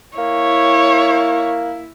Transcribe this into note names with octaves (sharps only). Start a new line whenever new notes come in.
A#3 E4 C#5